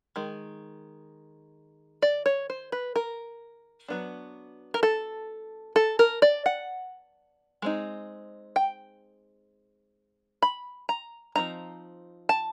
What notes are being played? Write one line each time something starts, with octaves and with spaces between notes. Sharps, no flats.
D#3 G#3
D5
C#5
C5
B4
A#4
F#3 B3 D4
A#4
A4
A4
A#4
D5
F#5
G#3 C4 D#4
G5
B5
A#5
F3 A3 C4 D#4 A#5
A5